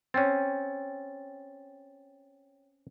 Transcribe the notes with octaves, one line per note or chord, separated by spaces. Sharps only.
C4 C#4 C#5 G5 A6